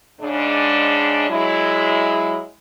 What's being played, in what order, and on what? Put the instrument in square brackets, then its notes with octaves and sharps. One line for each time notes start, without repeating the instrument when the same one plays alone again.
[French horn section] G#2 C#3 G#3 D4
F#3 G#3 E4